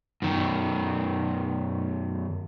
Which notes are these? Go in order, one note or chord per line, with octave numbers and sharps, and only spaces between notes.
F#2 D#3